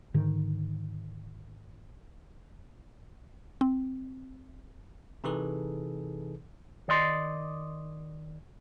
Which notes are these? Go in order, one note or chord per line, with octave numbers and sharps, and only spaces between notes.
G#2 D3 D#3
C4
C3 E3 D#4 G#4 A4 B4
D#3 D5 D#5 C6